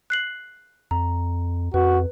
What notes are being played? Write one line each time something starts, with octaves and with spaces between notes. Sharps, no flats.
F#6 C7 F#7
F2 A#5
F2 F#4 B4